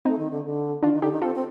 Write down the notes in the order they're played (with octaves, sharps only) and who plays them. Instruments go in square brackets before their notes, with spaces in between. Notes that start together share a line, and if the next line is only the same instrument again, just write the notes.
[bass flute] A3 [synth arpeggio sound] C4 D#4
[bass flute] D#3
D3
D3
[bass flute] D#3 [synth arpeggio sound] D4 F4
[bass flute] D#3
[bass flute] D3 [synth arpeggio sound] D#4 G4
[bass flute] D#3
[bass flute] C4 [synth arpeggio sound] F4 A4
[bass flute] C4